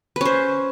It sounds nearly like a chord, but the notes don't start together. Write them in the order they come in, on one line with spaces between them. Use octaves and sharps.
B4 C#4 C5